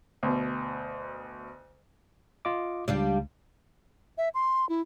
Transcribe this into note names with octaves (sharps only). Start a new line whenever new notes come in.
D2 B2
F4 D#5 D6
C#2 G3 D4 F4
E5
C6
E4